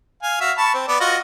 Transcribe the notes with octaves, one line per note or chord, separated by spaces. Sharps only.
F5 G#5
F#4 E5 F5
A5 B5 C#6
C4
B3 D5
F4 F#4 D#5